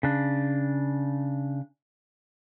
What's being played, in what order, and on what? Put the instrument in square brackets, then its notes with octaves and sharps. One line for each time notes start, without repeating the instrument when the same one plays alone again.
[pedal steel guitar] C#3 D4